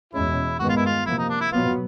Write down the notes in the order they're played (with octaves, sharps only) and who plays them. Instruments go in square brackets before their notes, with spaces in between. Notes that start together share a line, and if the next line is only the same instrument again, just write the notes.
[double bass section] E2 B2 G#3 C#4 [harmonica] E4
[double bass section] G2 D#3 G#3 B3 [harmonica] F#4
[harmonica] F4
E4
F4
[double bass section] C3 F3 A#3 [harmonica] E4
[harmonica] D#4
D4
E4
[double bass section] B2 F#3 B3 [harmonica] F4